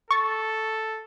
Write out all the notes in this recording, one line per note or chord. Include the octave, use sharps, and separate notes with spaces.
A4 C#6 A6